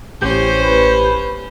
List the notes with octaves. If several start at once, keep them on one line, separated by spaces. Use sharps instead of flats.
A1 C#4 G4 C5 G6
B4